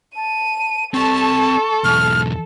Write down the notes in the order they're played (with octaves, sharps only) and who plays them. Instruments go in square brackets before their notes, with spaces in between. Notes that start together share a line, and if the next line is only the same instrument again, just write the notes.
[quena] A5 [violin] D#7
[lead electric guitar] C4 D5 [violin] A4 [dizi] A5 [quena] C#6
[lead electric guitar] B1 E2 [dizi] F6